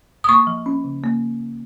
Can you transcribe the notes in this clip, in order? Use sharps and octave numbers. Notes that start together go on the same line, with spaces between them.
D#6
A#3 C#6
F3
C#4
C#3
A#3